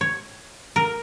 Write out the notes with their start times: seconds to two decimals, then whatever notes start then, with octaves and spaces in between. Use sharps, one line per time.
0.01 C#5
0.76 A#4